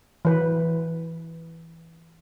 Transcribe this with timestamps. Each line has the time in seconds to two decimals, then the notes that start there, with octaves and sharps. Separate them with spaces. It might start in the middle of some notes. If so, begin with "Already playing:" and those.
0.25 E3 B4